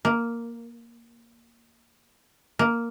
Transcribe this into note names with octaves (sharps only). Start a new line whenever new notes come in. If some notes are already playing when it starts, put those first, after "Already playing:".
A#3
A#3